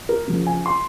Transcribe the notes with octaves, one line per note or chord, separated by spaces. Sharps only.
A#4
C#3 F3
G#5
C6